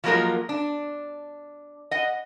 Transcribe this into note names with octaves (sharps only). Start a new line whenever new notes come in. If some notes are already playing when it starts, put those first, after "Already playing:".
F3 F#3 G#3 A#3 F4 A#4
D4
D#5 F#5